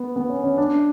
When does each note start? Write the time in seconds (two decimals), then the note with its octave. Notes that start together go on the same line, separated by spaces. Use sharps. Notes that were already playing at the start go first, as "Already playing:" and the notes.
Already playing: B3
0.16 B3
0.29 C#4
0.44 C#4
0.57 D4